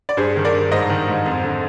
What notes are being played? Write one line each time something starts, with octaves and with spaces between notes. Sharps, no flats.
D5
G2 G#4 C5
D#3
A#4 D5
G2
G#2 C5 D#5
D#3
G#2
F2
D3